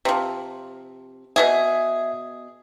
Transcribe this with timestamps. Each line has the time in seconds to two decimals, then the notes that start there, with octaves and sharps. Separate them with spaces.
0.05 C3 F3
1.36 B2 F#3 G#4 E5